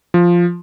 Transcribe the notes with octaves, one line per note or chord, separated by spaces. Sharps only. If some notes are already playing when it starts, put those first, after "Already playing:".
F3